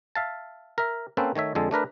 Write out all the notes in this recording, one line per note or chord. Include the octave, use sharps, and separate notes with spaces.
E5 F5 A5
A#4 E5
A#3 C4 C#4 A4 B4 C5
D#3 A3 C#5 E5
F2 D3 G#3 A4
A3 D4 A#4 B4